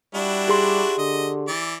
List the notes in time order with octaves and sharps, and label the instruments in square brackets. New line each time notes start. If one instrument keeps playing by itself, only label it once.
[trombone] G3 [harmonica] D4 E4 F#4
[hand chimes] G4 G#4 C6
[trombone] D3 [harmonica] D#5
[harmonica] E3 D5